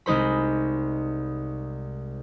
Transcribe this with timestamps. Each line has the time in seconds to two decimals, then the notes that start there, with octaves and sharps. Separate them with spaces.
0.06 C2 G#3 D#4 C5 B5